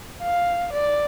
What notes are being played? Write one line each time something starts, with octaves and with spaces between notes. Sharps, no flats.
F5
D5